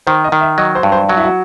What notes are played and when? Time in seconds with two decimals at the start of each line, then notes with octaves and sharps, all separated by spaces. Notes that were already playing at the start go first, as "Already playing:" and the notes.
0.07 D#3 C5
0.24 D#5
0.32 D#3
0.41 E5
0.58 F#3 D#5
0.75 C5
0.83 G2
0.92 C5
1.09 F#3 F#4
1.17 E4
1.24 F#4